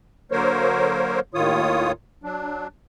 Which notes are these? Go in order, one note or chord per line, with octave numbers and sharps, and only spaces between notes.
D3 F#3 A#3 A#4 C5 C#5
D#2 A2 D#3 F4 C#5 D#6
F#3 D4